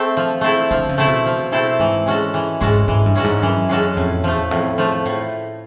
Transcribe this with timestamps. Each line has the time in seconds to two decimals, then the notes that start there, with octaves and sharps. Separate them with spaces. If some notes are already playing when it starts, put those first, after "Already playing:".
Already playing: A3 C4 A4
0.17 F3
0.41 A3 C4 E4 A4
0.71 D3 F3
0.89 C#3
0.98 A3 C4 E4 A4
1.08 B2
1.26 F3
1.52 A3 C4 E4 A4
1.79 G#2 E3
2.06 G#3 C#4 F#4 A4
2.34 E3
2.61 G#2 G#3 C#4 F#4 A4
2.88 G#2 E3
3.06 G2
3.15 G#3 C#4 F#4 A4
3.24 G#2
3.43 F#2 E3
3.69 G#3 C#4 F#4 A4
3.97 F2 A2
4.24 E2 F3 A3
4.51 F2 A2
4.78 F3 A3
5.06 A2